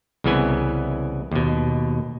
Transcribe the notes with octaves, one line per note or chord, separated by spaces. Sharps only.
C2 C#3 E3 B3 G#5
D#2 B2